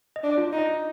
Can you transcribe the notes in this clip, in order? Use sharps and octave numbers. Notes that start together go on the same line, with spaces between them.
D#5
D4
F4
D#4
D#5